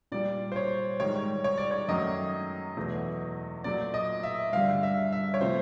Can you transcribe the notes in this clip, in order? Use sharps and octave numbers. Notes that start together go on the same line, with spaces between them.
A#2 G3 D5
C5
C#5
G#2 D#3 G3 C#5
C#5
D5
C#5
F#2 D#3 F#3 A3 D#5
E2 B2 F#3 A3
A#2 F#3 A3 D5
D#5
E5
G2 D3 G3 F5
E5
E5
C#5
C3 F3 A3 C5